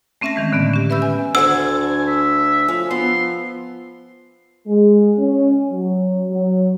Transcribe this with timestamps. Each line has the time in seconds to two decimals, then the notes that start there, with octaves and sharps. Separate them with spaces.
0.21 A3 C4 C#4 E5 A5 A#6
0.36 D#3 E3 G#3
0.52 A2 D3 B3 D#5
0.73 C#4 G4
0.90 B4 E5 B5 E6 G6
1.02 G#5
1.35 D2 A4 C5 F#5 G#5 E6
2.07 E5
2.68 F3 C#4
2.91 B3 C6
4.68 G#3
5.19 C#4
5.71 F#3
6.30 F#3